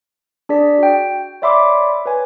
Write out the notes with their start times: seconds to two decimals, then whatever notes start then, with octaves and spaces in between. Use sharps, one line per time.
0.49 D4 G#4 D5 B6
0.78 F#4 G5
1.42 C#5 D5 E5 B5 C6 D6
2.06 B4 C#5 G#5